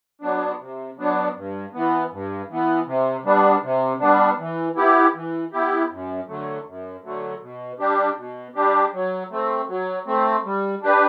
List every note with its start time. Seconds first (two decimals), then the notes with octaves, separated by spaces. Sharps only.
0.22 F#3 B3 D4
0.60 C3
0.98 F#3 B3 D4
1.36 G2
1.74 E3 B3
2.12 G2
2.50 E3 B3
2.87 C3
3.25 G3 B3 D4
3.63 C3
4.00 G3 B3 D4
4.39 E3
4.76 B3 E4 G4
5.15 E3
5.53 B3 E4 G4
5.90 F#2
6.28 D3 F#3 A3
6.66 F#2
7.04 D3 F#3 A3
7.42 B2
7.80 G3 D4 G4
8.17 B2
8.55 G3 D4 G4
8.93 F#3
9.31 A3 C4
9.69 F#3
10.07 A3 C4
10.45 G3
10.83 D4 G4 B4